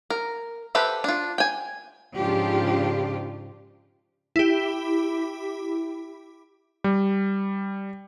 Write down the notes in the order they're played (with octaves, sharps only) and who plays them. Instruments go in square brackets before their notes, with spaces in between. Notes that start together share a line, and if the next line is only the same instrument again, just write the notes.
[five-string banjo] A#4
G4 A4 B4 C5 E5
D4 F4
G5 G#5
[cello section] G#2 C#3 F3 D4 F4 G4
[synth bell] E4 G4
[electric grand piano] G3